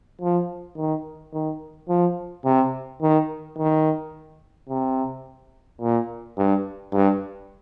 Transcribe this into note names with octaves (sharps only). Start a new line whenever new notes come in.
F3
D#3
D#3
F3
C3
D#3
D#3
C3
A#2
G2
G2